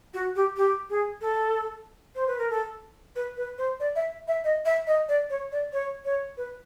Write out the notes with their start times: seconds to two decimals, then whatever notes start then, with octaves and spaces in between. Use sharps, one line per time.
0.14 F#4
0.35 G4
0.57 G4
0.90 G#4
1.21 A4
2.15 C5
2.27 B4
2.38 A#4
2.50 A4
3.15 B4
3.37 B4
3.58 C5
3.80 D5
3.95 E5
4.28 E5
4.44 D#5
4.65 E5
4.87 D#5
5.08 D5
5.30 C#5
5.52 D5
5.73 C#5
6.05 C#5
6.37 B4